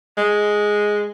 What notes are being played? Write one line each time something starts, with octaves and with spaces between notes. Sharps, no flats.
G#3